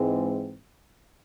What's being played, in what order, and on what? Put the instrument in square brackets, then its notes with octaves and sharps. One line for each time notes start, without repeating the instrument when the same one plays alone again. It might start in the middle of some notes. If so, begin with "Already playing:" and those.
Already playing: [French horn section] G#2 E3 G#3 C4